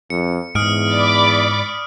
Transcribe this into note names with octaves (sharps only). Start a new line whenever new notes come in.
F2 C#7
E2 G#2 D#6 F6 D7
D5 B5 D6